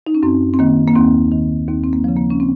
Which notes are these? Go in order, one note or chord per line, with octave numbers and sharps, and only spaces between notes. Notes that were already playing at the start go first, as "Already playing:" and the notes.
D#4
C#4
F#2 C4
C4
D#3 A#3
A#3
D#2 C4
D#3
D#2 C4
C4
A#3
C#3 F3
A#3
C#4
C4